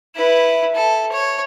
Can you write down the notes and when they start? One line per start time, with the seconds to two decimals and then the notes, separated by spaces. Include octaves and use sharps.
0.15 E4 B4
0.75 A4
1.12 C#5